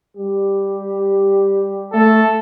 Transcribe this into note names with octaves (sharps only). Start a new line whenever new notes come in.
G3 G4
A3 A4